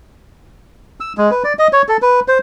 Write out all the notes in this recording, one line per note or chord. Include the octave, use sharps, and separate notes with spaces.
E6
G#3
B4
D5
D#5
C#5
A4
B4
C5